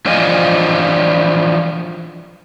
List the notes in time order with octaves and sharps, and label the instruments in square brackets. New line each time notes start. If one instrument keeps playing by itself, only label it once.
[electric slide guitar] E3 F3 D4 F4 D#5 G#5